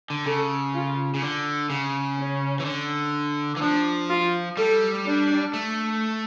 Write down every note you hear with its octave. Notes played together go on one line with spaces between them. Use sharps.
D3
C#3 A4
F4
C#3
D3
C#3
C#4
E3
D3
E3
F3 D4
F4
G3 A4
D4
A3